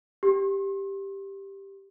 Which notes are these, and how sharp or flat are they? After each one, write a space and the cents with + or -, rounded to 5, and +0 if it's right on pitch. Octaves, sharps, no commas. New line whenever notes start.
G4 +0 C6 +40